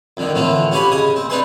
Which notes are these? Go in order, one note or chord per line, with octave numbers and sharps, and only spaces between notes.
F2 D3 D#3
A2 D3 E3 F3 F4
C#4 F#4 G4 F5 G#5 B5
C#3 D#5 G#5 D#6
C4
D4 D#4 B4 G#5 C6